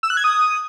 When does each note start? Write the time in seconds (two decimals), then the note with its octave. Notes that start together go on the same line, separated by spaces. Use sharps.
0.03 E6
0.10 F#6
0.17 G#6
0.24 D#6